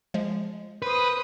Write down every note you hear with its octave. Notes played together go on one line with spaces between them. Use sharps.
F3 G#3
B4 C5 D#6